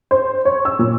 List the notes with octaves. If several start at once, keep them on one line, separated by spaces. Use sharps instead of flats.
C5
C#5
E6
A#2